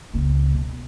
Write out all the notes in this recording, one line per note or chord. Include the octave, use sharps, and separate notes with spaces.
C#2 A#2
B2